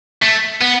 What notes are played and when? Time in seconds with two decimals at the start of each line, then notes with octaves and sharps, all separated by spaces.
0.23 A3
0.62 B3